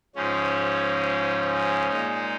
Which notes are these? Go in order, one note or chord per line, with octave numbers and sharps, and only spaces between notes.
G#2 F3 G#3 C#4
A#2 G#3 D#4